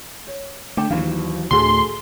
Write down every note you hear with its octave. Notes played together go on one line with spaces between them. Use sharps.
C#5
D3 A3 G5 D6
D#2 E3 F#3 F5
D2 A2 D3 F#4 G#4 A4 C6